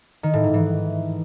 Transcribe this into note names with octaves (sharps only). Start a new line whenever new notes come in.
D#3
A2
G#2
E3